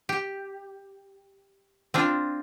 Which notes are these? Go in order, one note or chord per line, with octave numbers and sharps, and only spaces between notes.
G4
C4 D4 F4